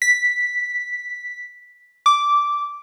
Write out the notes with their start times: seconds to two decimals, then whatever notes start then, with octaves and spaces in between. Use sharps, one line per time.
0.02 B6
2.06 D6